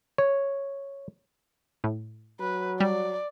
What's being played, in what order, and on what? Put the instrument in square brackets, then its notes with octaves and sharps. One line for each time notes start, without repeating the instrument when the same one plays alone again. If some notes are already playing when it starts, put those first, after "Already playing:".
[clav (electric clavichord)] C#5
[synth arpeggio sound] A2
[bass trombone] F#3 [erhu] B4
[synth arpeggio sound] G3 [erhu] D5